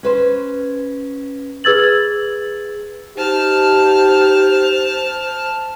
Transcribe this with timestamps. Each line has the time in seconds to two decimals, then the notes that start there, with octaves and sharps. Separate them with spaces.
0.03 C#4 B4 C5
1.64 G#4 B4 E6 G#6 A6 F#7
3.17 D#4 G4 C5 A5 F6